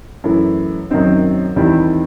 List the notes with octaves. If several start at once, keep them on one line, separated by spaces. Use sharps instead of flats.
F#2 E3 A3 E4
F#2 D#3 F#3 C4 D#4
E2 D#3 G3 C4 E4